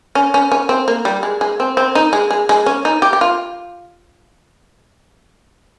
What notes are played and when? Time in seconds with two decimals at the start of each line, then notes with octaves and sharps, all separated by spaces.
0.15 C#4
0.34 C#4
0.52 C#4
0.69 C4
0.88 A#3
1.05 G3
1.23 G#3
1.41 G#3
1.60 C4
1.77 C4
1.95 D#4
2.13 G#3
2.31 G#3
2.49 G#3
2.66 C#4
2.85 D#4
3.02 G4
3.13 G4
3.21 F4